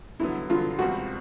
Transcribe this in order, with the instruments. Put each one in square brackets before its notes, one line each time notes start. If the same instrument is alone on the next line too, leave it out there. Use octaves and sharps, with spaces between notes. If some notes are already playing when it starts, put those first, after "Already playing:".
[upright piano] G2 D3 F#3 B3 [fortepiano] E4
[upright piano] G2 D3 F#3 B3 [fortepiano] F4
[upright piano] C#2 B2 G3 C4 [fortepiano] F#4